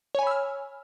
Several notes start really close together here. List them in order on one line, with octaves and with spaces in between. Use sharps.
C#5 G#5 B5 E6 F6